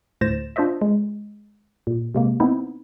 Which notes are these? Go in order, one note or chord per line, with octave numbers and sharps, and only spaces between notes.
D2 A2 C5 A6 A#6 E7
D4 F4 C5 D#5 E5
G#3
A#2
C3 G#3 A#3
B3 C4 D#4 E4